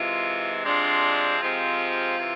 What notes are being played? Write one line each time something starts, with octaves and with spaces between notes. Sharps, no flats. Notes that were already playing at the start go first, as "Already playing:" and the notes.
Already playing: C3 E3 G#3 F4
C3 F3 G#3 C4 D4
C3 F3 G#3 C4 F4
C3 E3